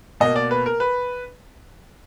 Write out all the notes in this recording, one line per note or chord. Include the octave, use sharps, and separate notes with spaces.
B2 A#3 D#5
D5
B4
A#4
B4